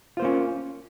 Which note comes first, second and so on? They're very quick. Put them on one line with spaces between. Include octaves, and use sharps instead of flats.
F4 C5 A#3 C#4